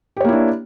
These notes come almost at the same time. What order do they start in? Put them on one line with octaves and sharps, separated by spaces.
G4 C#5 A#3 E4 D4